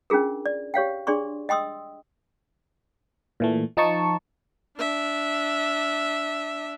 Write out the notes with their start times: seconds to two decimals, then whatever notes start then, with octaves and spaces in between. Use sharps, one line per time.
0.10 C#4 D4 F4 G#4 A#4
0.46 D5
0.74 G4 C#5 F5 G5
1.07 D4 G#4 D5 C6 C#6
1.49 D#5 G5 C6 D#6 E6
3.40 A#2 E3 A3
3.77 F3 D#4 A5 C#6
4.78 D4 E5